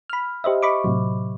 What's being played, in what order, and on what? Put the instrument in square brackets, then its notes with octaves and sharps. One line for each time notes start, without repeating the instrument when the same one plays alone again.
[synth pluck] B5 F6
G4 C5 D#5 E5
D#5 B5 C#6 D6
A2 C3 F#3